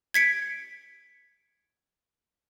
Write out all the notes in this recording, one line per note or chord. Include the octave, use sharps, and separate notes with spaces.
G#6 B6 C#7 D7